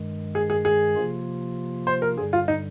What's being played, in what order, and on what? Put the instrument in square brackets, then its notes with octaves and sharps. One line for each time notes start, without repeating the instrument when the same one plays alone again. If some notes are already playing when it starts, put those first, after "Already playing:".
Already playing: [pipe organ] G2 D#3 G#3
[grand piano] G#4
G#4
G#4
[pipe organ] C3 F3 A#3 F4
[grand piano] C5
A#4
[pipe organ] G2 D3 G3 [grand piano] G#4
[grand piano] F4
D#4